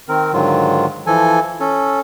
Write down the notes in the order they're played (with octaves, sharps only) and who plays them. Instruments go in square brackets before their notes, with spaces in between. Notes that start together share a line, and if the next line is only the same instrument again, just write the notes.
[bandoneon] D#3 C4 A#4
G#2 D3 D#3 F#3 F4
E3 F3 A4 G#5
C#4 A4